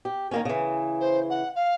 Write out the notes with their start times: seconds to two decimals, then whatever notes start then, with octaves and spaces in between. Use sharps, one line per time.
0.05 G4
0.31 D#3 A#3 C#4
0.45 C#3 E3
1.00 C5
1.29 F#5
1.55 F5